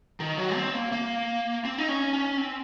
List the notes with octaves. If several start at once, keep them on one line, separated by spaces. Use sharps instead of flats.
D#3
F#3
C4
A#3
A#3
C4
D#4
C#4
C#4
C4